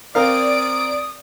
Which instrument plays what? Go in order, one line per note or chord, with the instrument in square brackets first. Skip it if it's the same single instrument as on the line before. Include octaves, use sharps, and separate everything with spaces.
[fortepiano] C4 A#4 F5 [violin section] D5 D7 [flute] D#6